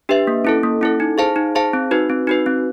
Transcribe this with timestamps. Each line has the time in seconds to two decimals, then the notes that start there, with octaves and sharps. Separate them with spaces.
0.09 D4 G4 B4 E5
0.27 A#3
0.45 C#4 E4 A4
0.63 A#3
0.81 C#4 E4 A4
1.00 D#4
1.18 G#4 C5 F5 A5
1.36 D#4
1.55 G#4 C5 F5 A5
1.73 C4
1.91 D#4 F#4 B4
2.10 C4
2.27 D#4 F#4 B4
2.46 C4